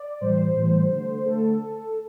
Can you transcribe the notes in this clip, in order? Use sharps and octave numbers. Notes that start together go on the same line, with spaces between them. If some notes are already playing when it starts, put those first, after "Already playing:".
Already playing: D5
A2 E3 G3 C5
A2 E3 G3
D3 A3
D3 A3 A4